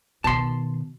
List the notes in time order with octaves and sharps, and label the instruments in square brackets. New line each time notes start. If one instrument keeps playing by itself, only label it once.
[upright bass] B2 D#3 [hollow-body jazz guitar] A5 C6